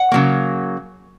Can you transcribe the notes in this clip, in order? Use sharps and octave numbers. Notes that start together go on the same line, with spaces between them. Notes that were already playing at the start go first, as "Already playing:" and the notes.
Already playing: F#5
C#3 F#3 A#3